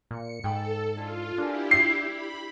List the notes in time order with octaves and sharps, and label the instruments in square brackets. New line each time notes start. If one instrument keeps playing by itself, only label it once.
[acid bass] A#2 [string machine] C#7
[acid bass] G#2 [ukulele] G#4 G5 B5 [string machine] A4
[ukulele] D4 E4 A5 [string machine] F4
[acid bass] D4 [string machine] E4 G4 [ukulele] F4 A#4 G#5
[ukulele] F4 D5 B5 [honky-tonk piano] C7
[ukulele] D4 [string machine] B5